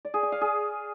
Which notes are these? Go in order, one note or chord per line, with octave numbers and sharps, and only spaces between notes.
D5
G#4
G#5
F5
G#4